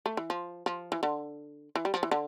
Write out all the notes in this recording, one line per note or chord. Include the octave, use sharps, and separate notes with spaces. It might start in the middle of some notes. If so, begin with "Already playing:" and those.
A3
E3
F3
F3
E3
D3
E3
G3
F3
E3
D3